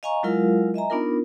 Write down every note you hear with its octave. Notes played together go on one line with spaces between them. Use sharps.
D#5 F5 G#5 A#5 C#6
F#3 G#3 E4 F4 A#4 F5
D#5 E5 G#5 A#5
B3 D4 D#4 F4 A#4